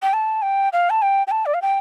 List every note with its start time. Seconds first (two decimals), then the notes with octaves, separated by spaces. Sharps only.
0.02 G5
0.13 A5
0.42 G5
0.73 F5
0.90 A5
1.02 G5
1.27 G5
1.31 A5
1.46 D5
1.54 F5
1.62 G5